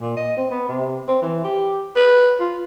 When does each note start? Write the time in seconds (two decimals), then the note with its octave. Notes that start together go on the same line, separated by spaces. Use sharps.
0.01 A#2
0.17 D#5
0.37 C4
0.51 B3
0.68 C3
1.08 C4
1.22 E3
1.44 G4
1.96 B4
2.40 F4